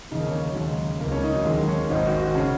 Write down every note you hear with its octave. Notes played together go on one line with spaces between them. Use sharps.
D#2 C#3 D#4
A#3
C#4
A#3
F#3
D#2 C#3 G#3
C#2 C#3 A#3
C#4
D#4
F#3
D#2 D#3 G#3
C#4
G#1 G#2 D#3 D#4
F#4
F#4
C#3 C#4